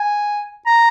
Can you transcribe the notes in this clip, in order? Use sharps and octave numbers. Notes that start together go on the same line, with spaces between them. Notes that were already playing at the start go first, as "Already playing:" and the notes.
Already playing: G#5
A#5